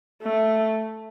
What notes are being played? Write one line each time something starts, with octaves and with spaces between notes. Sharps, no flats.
A3